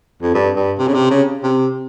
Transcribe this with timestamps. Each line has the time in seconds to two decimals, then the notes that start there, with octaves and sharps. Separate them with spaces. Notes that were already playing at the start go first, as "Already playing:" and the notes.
0.22 F2
0.34 G2
0.56 G2
0.78 C3
0.88 C#3
0.94 C3
1.11 C#3
1.43 C3